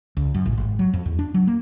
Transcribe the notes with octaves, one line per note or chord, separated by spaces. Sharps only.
C#2
F#2
A1
G#1
F#3
F2
E2
D4
F#3
A#3